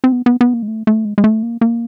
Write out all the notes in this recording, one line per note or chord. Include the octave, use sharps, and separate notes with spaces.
C4
B3
B3
B3
A#3
G#3
A3
A3
G#3
G#3
A3
A#3
A#3